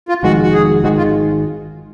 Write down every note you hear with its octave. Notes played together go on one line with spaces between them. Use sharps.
F4
F1 F2 D#3 G#3 F#4
F#4
G#4
G#1 G#2 D#3 G#3 F#4
F4